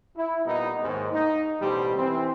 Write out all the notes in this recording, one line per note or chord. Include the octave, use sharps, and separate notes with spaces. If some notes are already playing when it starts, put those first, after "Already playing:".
E4
A#2 G3 B3 D#4
D#2 G#2
D#4
A1 B2 G3 G4 C5
E3 C4